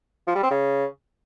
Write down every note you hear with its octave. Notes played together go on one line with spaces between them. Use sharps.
F3
G3
C4
C#3